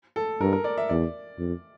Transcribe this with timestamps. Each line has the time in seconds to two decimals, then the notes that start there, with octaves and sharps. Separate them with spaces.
0.16 A4
0.41 G2 A#4
0.53 A#4
0.64 D5
0.78 E5
0.89 E2 D5
1.38 F2